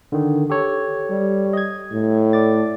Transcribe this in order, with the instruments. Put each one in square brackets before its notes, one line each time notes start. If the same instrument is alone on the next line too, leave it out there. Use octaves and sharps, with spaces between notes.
[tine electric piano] D3 D#3
G4 A4 C#5
[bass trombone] G3
[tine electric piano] D#5 G#6
[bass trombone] A2
[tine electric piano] D5 D6 A6